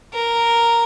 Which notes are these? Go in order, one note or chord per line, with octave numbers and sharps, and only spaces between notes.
A#4